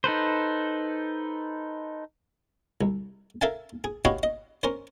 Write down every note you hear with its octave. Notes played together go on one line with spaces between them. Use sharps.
D#4 A4 B4 C5
C2
A4 A#4 E5 F5 G#5 A5
G#4
F#4 G4 B4 C#5 D#5 F5
D#5
C#4 A#4 C5